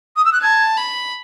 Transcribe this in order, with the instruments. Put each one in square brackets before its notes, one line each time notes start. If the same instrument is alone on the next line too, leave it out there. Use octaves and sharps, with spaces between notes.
[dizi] D#6
E6
F#6
[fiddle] A5 [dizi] G#6
[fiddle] B5